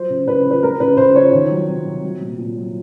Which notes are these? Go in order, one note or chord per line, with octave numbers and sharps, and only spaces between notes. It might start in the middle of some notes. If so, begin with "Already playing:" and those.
Already playing: F3 F#3 C5
C#3
C#3 B4
F3
B4
F3 A#4
C#3 B4
C#3 C5
F3 C#5
D#3
F#3
C3
C3
F#3
A#2
A#2
F#3